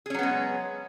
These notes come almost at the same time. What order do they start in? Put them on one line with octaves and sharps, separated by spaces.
G#4 C#4 F#3 B3 G#3